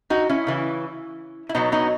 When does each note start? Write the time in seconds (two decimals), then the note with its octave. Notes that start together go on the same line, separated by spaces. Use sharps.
0.10 D#4 F#4
0.29 C#4 E4
0.47 C#3 E3
1.49 E4
1.55 B2 F#3 B3 D#4
1.72 B3 D#4